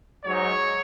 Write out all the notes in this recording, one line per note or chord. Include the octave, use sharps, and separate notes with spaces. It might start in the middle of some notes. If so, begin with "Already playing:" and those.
G#2 F#3 D#4 C#5